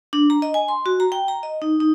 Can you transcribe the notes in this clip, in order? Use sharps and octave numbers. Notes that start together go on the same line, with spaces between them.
D4
A#5
D#5
G#5
C6
F#4
A#5
G5
A#5
D#5
D#4
D#4